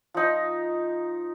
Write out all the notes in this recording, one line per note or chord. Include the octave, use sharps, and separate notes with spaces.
F3 D#4